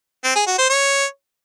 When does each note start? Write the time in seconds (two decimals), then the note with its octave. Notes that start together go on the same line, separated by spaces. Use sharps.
0.24 C4
0.36 G#4
0.47 F#4
0.58 C5
0.70 C#5